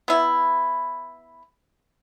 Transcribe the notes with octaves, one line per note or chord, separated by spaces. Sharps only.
B3 E4